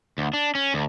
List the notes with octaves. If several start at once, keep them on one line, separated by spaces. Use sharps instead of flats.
D2
D4
C#4
D2